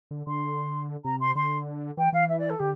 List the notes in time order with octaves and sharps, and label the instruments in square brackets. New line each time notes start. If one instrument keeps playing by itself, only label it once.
[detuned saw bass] D3
[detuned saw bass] D3 [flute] C6
[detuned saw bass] C3 [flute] A#5
[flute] C6
[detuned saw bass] D3 [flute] C6
[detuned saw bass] E3 [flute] G5
[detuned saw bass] E3 [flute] F5
[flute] E5
D5
A4
[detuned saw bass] D3 [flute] G4